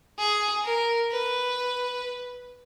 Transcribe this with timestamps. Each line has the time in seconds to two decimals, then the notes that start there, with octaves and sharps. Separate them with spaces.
0.18 G#4
0.64 A#4
1.11 B4